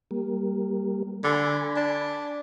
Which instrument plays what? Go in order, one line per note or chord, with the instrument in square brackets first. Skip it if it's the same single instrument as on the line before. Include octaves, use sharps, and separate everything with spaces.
[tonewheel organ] G3 A#3
[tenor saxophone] D3 [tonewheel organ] G#5 B5
[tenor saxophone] D4